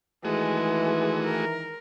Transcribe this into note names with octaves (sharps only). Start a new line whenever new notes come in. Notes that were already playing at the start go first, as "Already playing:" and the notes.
D#3 E3 G#3 A3 F#4 G#4
A#4